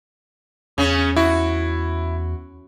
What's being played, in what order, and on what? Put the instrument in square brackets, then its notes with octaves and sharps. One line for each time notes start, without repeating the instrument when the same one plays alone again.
[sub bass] E2 [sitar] C#3 C#4
[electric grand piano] E4 [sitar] F#4